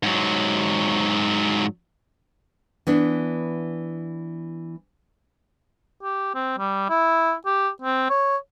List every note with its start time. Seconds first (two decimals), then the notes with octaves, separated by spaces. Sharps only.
0.03 G#2 F#3
2.87 E3 B3 D4
6.03 G4
6.35 C4
6.58 G3
6.90 E4
7.46 G4
7.82 C4
8.10 C#5